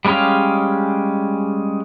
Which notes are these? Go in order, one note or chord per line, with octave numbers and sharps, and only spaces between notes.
G3 G#3 C#4 G4 F5